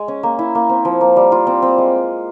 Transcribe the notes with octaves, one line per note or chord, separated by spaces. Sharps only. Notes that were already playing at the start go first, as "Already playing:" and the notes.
Already playing: G#3
C#4
A#3
E4
A#3
C4
F3
A#3
G3
F4
C4
C4
G#3